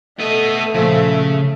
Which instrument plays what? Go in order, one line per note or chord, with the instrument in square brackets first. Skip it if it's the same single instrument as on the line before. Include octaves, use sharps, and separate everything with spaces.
[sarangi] A3 [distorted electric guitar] B3 D#5 [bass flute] A4
[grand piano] A#2 F3 [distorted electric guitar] C#3